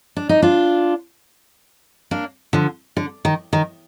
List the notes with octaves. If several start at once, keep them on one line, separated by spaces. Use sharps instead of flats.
D4
D#4
D4 F4
A#3 D4
D3 F3
D3
D#3
D#3